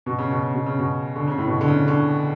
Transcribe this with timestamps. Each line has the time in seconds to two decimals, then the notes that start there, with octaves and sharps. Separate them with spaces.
0.06 B2
0.18 C#3
0.31 B2
0.42 C#3
0.54 B2
0.66 C#3
0.79 B2
1.16 D3
1.28 C#3
1.38 A2
1.47 B2
1.61 D3
1.68 C#3
1.88 D3